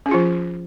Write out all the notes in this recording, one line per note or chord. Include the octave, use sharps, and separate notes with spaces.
F3 C#4 F4 G#4